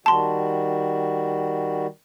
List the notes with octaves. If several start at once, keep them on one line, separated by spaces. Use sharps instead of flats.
D#3 G3 F#4 A5 C6